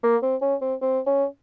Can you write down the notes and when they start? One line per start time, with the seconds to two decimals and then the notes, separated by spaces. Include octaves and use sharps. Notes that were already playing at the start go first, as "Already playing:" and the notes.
0.03 A#3
0.23 C4
0.42 C#4
0.61 C4
0.82 C4
1.07 C#4